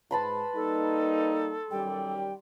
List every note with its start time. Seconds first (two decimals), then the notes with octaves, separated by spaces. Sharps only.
0.11 G#2 B4 A5 B5 C6
0.55 G3 A#3 D#4 A4
1.71 F#2 D#3 G3 G5